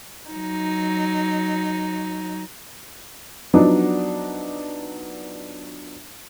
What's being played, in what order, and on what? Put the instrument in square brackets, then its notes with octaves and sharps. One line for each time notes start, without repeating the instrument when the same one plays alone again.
[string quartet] F#3 D#4
[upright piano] F3 F#3 B3 D4 D#4